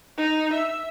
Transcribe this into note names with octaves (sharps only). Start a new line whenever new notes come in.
D#4
E5